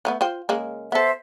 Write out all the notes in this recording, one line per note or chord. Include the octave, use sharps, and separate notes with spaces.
F3 A3 B3
F4 C5 G5
C#3 G#3 A#3
B3 A4 C5 E5